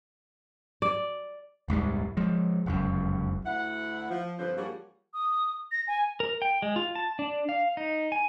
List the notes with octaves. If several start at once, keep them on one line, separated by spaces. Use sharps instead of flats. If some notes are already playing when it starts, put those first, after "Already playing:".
D5
D#1 C2 G#2 G3
F3 G#3
F1 C#2 F#2
D2 E4 F#5
F3
G2 D3 F3 C4 B4 C5
F3 G3 A#3 F#4 G#4 C#5
D#6
A#6
G#5
A#4
G5
G#3
F4
A5
D4
F5
D#4
G#5